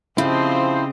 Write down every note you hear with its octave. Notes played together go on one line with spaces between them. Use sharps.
C#3 F3 C4 E4 G4 C5 D#5